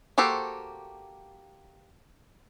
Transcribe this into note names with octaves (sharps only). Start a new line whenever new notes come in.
A#3 F#4 G4 A4 C5